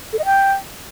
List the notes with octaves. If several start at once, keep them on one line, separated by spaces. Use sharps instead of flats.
A4
D#5
G5